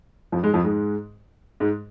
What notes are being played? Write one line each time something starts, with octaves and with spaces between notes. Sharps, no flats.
F2 F3
G#2 G#3
F2 F3
G#2 G#3
G#2 G#3